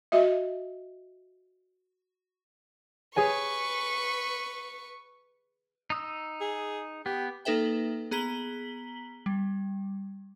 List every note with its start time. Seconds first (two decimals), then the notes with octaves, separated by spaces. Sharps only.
0.12 F#4 D#5 E5
3.16 G#4 B4 C#5 G#5 C#6
5.90 D#4 D#6 E6
6.41 G#4
7.06 B3 G4
7.45 A#3 D#4 A4 B4 E5 G5
8.11 B3 G#4 A#5 B6 F#7 G7
9.26 G3